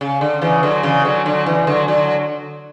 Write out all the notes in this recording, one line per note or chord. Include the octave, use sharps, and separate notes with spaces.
C#3
D3
C#3 E3
D3 F#3
C#3 E3
D3 F#3
D3 F#3
C#3 E3
D3 F#3
D3 F#3